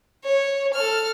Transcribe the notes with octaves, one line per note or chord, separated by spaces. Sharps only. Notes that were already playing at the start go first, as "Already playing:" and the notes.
C#5
A4 F6